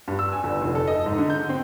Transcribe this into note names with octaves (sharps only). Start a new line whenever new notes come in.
G2
E6
G#5
G1
F1
A4
D#5
G#2
D3
G6
C4